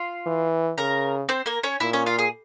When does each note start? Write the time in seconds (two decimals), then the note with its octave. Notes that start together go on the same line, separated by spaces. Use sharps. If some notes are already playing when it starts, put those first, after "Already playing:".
Already playing: F4 F5
0.26 E3
0.78 C#3 A#4 A#5
1.29 C4 C5
1.46 A#3 A#4
1.63 C#4 C#5
1.80 A#2 E4 E5
1.93 C#4 C#5
2.06 F4 F5
2.19 G#4